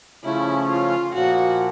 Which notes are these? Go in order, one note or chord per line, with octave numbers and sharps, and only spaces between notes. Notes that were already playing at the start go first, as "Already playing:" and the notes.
C#3 F3 A3 C#4 E4
F4
A#2 F3 A#3 F#4